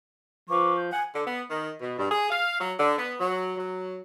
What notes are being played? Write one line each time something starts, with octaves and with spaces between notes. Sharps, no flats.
F3 B4 C#6 D6
G6
F#5 G#5
D3
B3
D#3
B2
G2
G#4
F5
F#3
D3
B3
F#3
F#3